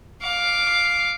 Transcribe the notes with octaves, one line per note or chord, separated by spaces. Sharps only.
F5 D6